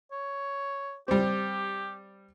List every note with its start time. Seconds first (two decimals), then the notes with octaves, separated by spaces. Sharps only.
0.12 C#5
1.08 G3 C4 G4